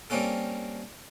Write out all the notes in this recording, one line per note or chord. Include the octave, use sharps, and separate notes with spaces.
G3 A#3 C4 C#4 F4 A4